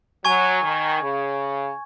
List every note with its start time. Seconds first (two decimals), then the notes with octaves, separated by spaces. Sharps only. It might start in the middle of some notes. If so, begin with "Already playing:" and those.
0.25 F#3 G#5 C#6 G#6
0.63 D#3
1.01 C#3